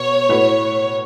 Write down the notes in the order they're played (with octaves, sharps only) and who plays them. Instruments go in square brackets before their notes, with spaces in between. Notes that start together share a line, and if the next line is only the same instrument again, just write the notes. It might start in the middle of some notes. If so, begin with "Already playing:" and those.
Already playing: [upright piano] B2 B4 [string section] C#5
[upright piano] A2 A3 F#4 B4